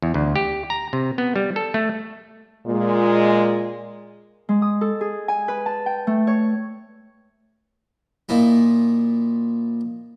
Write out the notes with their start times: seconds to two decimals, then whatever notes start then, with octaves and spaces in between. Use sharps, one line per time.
0.02 E2
0.14 D2
0.36 G4
0.70 A#5
0.93 C3
1.18 B3
1.36 G3
1.56 A4
1.74 A3
2.67 A#2 G#3
4.49 G#3
4.62 D#6
4.81 A4
5.01 G#4
5.28 G#5
5.48 B4
5.66 A5
5.86 G5
6.07 A3
6.27 C#5
8.29 A#2 F3 D#4 E4